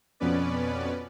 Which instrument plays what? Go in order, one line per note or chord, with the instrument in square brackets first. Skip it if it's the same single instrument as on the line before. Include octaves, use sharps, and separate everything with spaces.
[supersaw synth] F2 B2 B3 C#4 B4 D5